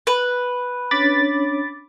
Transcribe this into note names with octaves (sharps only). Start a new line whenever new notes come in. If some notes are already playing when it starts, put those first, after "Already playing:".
B4
C#4 D4 C#5 B5 D6 A6